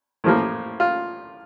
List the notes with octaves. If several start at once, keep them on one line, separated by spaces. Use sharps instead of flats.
A2 F3 A#3
F4